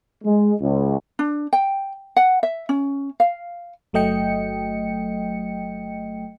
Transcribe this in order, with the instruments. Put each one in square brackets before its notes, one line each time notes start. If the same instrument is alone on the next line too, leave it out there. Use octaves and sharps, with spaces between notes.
[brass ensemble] G#3
C#2
[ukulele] D4
G5
F#5
E5
C#4
F5
[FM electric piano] G1 F#3 A3 D#5 G5 C#7